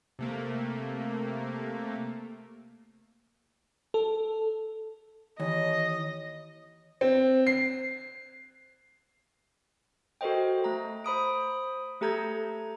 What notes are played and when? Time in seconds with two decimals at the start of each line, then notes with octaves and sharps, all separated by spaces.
0.19 C3 A3 A#3
3.94 A4
5.40 D#2 E3 C#5 D#5
7.01 C4
7.47 C7
10.21 F#4 A4 A#4 C5 D#5 G5
10.64 A3 A#5
11.04 C5 B5 D#6 D7
12.01 A3 G4 A4 A#5 G6 G#6